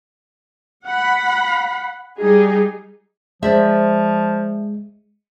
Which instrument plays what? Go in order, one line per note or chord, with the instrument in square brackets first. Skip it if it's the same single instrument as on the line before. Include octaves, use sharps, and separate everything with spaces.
[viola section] F#5 B5
G3 D#4 G#4
[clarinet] F3 [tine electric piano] G#3 [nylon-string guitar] C5 D5 E5